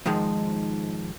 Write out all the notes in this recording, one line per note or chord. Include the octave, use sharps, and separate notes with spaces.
G#2 D#3 F3 G#3